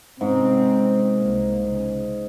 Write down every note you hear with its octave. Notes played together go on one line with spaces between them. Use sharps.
G#2 C3 C4 C#4
C2 A#3
C#3